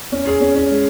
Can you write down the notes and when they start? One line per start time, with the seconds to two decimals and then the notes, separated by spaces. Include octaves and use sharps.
0.12 C#4
0.27 G#4
0.41 C#4
0.55 C#4
0.70 G#3